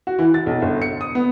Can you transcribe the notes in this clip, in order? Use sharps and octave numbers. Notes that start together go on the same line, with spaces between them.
F#4
E3
A6
B1
G1
C#7
D#6
B3